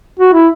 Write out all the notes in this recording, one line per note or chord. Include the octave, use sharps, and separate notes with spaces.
F#4
E4